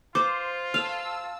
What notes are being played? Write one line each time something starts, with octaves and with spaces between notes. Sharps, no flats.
F4 C5 D6
F5 A5 E6